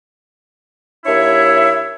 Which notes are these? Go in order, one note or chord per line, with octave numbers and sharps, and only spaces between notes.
D#2 D4 E4 C#5 E5